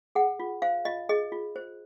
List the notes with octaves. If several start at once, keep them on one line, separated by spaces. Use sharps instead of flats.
G#4 F#5
F4
C5 F5
F4 D#5
G#4 D#5
F4
C5